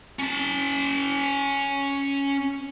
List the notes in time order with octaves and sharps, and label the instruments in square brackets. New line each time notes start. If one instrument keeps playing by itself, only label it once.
[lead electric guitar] C#4 A5